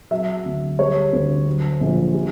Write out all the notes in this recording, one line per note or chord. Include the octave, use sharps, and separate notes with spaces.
F#3 E5
D2
G3 C#5
D2
F#3
A#1
G3